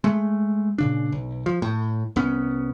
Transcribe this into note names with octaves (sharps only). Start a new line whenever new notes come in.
G#3 A3
A#2 C#3 D4
B1
F3
A2
C2 B3 C#4